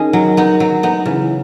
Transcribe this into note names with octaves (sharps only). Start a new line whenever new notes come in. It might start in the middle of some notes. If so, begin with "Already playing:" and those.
Already playing: D#3 C#4 G#4 D#5
F#3
B3 D#4
F#3
B3 D#4
C#3 E3
E3